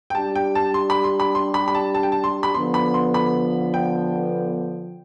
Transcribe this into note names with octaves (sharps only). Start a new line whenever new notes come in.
G5
G3 D4 G4 A5
G5
A5
C6
B5
C6
B5
C6
B5
B5
A5
A5
G5
A5
C6
B5
D3 F3 B3 C6
B5
C6
B5
G5